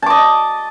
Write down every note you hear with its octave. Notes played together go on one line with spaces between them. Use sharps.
D#5 A5 D6